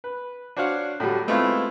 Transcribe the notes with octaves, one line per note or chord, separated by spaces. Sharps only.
B4
D4 F#4 C5 C#5 F5 F#5
A2 D3 F#3 G3
G#3 A3 B3 C4 E4 F4